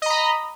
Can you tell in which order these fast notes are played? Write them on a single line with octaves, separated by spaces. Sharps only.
D#5 A#5 B5